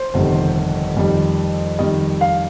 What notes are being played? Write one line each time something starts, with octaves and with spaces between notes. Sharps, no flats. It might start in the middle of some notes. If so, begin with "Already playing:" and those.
Already playing: C5
G1 F2 C3 D#3
F2 D#3 G3
F2 D#3 G3 D#5
F5